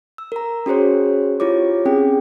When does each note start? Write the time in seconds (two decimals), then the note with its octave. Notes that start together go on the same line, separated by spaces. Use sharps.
0.18 E6
0.32 A#4 A#5
0.66 C#4 F#4 G#4 C5 C#5
1.40 E4 F4 G4 C#5 D6
1.85 C4 C#4 G#4 G5